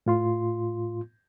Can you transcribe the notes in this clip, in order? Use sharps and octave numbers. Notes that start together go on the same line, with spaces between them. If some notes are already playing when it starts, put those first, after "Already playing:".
A2 F4 C6